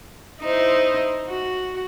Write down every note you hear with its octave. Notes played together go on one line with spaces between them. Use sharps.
D#4 E4 C5
F#4